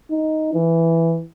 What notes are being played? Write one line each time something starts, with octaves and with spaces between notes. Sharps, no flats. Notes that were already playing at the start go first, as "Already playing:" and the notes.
D#4
E3